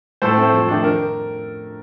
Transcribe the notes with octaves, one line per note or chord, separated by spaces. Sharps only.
A2 A4 C5
A3 C4
F2
D#3 A3 D4
A#4